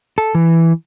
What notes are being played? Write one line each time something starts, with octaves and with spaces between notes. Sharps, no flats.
A4
E3